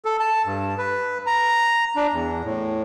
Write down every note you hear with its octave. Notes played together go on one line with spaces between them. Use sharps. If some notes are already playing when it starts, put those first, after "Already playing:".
A4
A5
G2
B4
A#5
D4
E2
A2